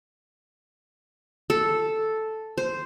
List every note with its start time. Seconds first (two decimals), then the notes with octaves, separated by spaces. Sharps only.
1.50 A4
2.58 C5